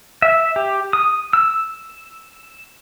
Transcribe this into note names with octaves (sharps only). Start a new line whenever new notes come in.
E5
G4
D#6
E6